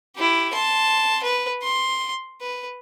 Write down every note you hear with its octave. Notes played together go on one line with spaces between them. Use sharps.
E4 G4
A5 C6
B4
C6
B4